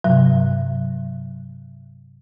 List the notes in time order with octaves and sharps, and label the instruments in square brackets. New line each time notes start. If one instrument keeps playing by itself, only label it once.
[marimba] G2 C3 F#3